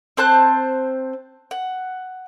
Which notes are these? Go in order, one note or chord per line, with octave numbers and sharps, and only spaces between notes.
C4 C5 A5 F#6
F#5